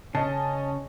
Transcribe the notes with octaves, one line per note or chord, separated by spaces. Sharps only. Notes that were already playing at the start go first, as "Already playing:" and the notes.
C#3 C#4 D#5 A5